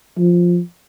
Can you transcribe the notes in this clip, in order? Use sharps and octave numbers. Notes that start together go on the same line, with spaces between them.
F3